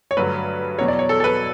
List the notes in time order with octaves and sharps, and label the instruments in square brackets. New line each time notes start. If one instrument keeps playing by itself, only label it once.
[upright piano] C#5
G2 D3 F#3 A3 B4
E2 B2 F#3 C#5
D5
C#5
A4
A4
B4